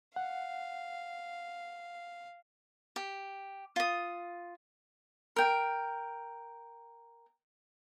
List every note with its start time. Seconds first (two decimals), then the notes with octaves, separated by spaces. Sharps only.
0.16 F5 F#5
2.96 G4
3.76 F4 D#6
5.36 A#4 G5